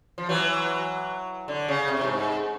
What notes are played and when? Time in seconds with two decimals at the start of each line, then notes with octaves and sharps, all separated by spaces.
0.18 F3
0.29 E3 F#3
1.48 D3
1.68 C#3
1.88 C3
2.01 A2
2.08 G#2